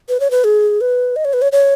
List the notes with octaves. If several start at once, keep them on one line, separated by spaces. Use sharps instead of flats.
B4
C#5
B4
G#4
B4
D#5
C#5
B4
C#5
C#5